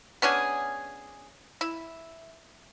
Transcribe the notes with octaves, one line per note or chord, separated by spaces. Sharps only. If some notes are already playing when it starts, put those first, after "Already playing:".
B3 C#4 D4 G#4
E4